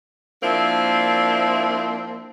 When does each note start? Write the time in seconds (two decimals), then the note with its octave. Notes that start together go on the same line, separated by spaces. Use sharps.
0.42 F3 A#3 C4 D4 E4